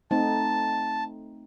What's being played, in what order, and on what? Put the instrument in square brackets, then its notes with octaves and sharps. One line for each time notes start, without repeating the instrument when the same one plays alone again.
[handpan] A3 C4 D#4 [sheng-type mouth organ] A5